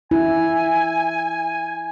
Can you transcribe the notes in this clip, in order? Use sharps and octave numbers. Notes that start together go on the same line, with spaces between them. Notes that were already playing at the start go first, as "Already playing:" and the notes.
E4 G#5